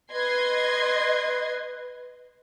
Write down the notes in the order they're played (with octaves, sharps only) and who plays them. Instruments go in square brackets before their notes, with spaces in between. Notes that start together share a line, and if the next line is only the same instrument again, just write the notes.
[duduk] B4 [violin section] D#5 C6 G#6